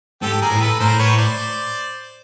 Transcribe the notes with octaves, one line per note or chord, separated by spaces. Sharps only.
G#2 G4 A4
G#4 A#4
A2
A4 B4
A2 A#4 C5
B4 C#5
C5 D5